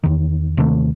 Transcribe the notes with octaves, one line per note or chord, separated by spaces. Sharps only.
E2 D#3
D#2 C3 D#3 A3